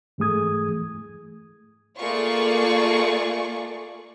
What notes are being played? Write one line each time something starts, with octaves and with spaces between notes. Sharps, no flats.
G#2 E3 A3 G#4 D#6 G#6
A3 A#3 F4 G#4 D5 C#6